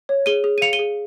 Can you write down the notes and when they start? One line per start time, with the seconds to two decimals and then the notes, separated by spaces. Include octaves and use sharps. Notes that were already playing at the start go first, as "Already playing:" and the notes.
0.09 C#5
0.26 G#4 D#7 G7
0.44 G#4
0.58 D#7
0.62 F5 C#7 F7
0.73 D#7 G7
0.79 G#4